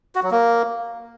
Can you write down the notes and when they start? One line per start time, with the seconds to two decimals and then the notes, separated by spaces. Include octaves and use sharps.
0.15 F#4
0.23 F#3
0.31 A#3